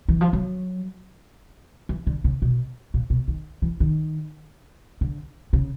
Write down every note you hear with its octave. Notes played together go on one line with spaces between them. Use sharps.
E3
F3
F#3
E3
D3
C#3
B2
A#2
B2
D#3
E3
D#3
D3
C#3